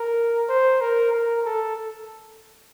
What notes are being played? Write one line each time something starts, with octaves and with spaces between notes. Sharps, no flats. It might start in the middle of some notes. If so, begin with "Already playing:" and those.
Already playing: A#4
C5
A#4
A#4
A4